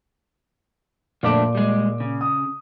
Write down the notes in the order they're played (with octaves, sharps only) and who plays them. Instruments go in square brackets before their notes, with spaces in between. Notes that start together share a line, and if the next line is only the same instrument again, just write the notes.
[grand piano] A#2 D6 [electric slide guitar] F3 A3 D4
[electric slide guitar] G3 G#3
C#3
[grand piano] D#6